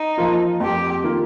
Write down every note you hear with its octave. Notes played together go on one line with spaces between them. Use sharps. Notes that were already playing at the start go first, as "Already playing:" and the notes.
Already playing: D#4
F3 A#3 F4
F2 G4
D#3 A#3 F4 A#4